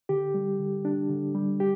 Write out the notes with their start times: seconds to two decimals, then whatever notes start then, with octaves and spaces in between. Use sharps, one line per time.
0.09 D3 G4
0.34 G3
0.59 D3
0.85 D4
1.09 D3
1.35 G3
1.60 G4